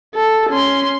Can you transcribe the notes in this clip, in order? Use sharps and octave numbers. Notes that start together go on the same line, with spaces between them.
A4
C#4 C6